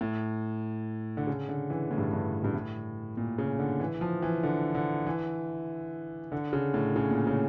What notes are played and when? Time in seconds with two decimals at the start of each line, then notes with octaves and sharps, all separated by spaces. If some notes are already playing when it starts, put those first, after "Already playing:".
0.01 A2
1.17 D3
1.27 C#3
1.49 D3
1.70 E3
1.91 A2
1.98 G2
2.13 G2
2.44 G2
2.54 A2
3.17 A#2
3.38 C#3
3.59 D3
3.80 E3
4.01 F3
4.22 E3
4.43 D3
4.74 D3
5.07 E3
6.32 D3
6.53 C#3
6.74 A2
6.96 C#3
7.11 A#2
7.27 C#3